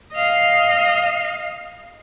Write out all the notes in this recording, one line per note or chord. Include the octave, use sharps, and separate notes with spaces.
D#5 F5